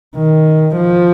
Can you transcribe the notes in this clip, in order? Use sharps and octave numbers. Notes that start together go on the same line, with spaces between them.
D#3
F3